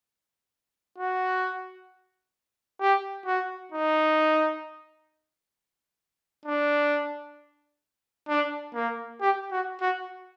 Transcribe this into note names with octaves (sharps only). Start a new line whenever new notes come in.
F#4
G4
F#4
D#4
D4
D4
A#3
G4
F#4
F#4